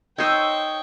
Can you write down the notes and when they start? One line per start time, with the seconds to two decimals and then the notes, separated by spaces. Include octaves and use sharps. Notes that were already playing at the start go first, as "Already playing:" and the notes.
0.18 D#4 C5 C#5 G5 C#6 D#6 E6